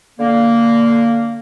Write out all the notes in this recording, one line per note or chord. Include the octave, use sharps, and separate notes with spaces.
D3 A#3